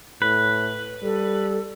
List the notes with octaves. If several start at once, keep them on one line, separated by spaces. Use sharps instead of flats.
A2 B4
G3 A4